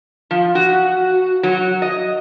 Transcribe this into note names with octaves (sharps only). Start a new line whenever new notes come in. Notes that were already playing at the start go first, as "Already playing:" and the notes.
F3
F#4
F#3
D#5